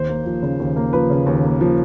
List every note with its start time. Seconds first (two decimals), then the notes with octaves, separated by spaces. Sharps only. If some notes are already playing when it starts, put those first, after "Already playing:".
Already playing: D#2 C5
0.09 A#3
0.26 F3
0.43 C#3
0.59 D#2
0.76 A#3
0.93 F3 B4
1.10 C#3
1.26 D#2
1.44 A#3
1.61 F3